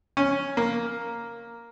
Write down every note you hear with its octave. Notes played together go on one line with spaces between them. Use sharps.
C#4
A#3